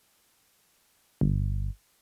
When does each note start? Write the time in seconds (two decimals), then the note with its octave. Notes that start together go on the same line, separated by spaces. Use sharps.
1.21 G1